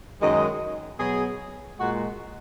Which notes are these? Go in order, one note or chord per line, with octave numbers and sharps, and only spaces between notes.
F#2 D#3 G#3 D#5
B2 F#3 G#4
A#2 G#3 F#4